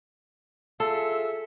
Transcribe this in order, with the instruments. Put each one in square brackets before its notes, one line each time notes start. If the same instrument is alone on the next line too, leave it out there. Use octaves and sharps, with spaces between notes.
[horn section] F4 G#4 E5 [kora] A4